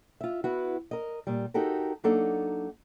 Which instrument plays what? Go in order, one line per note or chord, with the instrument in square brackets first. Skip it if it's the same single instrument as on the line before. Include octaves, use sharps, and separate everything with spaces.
[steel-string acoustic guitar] F4 E5
B3 E4 F#4
A#4 D#5
A#2 G3
D#4 F#4 G4 A4 A#4
F#3 A#3 D4 D#4 A4 F#5